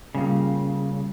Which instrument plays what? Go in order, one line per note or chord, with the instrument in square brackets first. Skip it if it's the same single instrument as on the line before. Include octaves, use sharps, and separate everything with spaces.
[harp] A#2 G3 [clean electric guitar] C#3